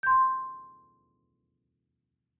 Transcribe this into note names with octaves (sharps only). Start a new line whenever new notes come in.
C6 G6